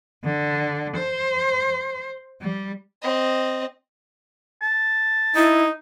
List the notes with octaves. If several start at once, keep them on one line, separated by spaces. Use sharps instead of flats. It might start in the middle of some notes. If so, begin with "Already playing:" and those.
D3
C5
G3
C4 D#5
A5
D#4 E4